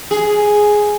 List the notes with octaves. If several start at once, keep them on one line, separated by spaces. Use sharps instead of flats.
G#4